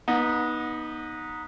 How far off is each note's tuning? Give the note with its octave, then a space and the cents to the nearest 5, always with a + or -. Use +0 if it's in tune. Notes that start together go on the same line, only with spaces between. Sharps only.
B3 -25 D#4 +0